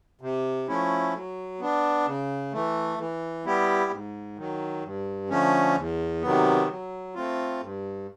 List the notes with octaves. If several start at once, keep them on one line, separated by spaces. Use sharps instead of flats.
C3
F3 A3 C#4 E4
F#3
B3 D4
C#3
E3 A3
E3
G3 B3 E4 G4
G#2
D#3 F#3
G2
D3 F3 A3 C#4
E2
C3 D#3 F#3 B3
F#3
A3 C4 F4
G2